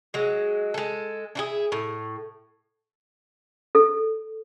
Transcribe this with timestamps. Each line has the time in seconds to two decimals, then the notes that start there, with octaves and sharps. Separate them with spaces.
0.14 F#3 G#3
0.74 G#3 A4
1.35 D4 E4 G#4
1.72 A2
3.75 A4